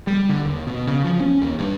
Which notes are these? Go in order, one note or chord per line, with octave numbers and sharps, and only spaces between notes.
G3
D3
D#2
B2
C#3
F3
C#4
D#2
G2